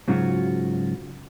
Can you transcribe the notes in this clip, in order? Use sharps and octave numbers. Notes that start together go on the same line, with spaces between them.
G#2 C#3 F#3 F4 F#4